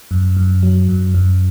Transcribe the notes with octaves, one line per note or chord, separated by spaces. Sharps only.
F#2
F#2
F#3
F#2
F#2